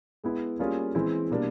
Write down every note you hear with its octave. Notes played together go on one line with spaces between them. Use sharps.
G#3 B3 E4
G3 A#3 C#4 F4 G#4
E3 G#3 C4 E4
B2 G3 A#3 D4